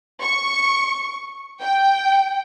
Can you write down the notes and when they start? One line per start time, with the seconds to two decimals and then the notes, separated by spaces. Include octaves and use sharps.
0.21 C#6
1.60 G5